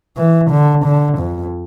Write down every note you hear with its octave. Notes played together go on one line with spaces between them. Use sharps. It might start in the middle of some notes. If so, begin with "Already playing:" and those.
E3
D3
D3
F2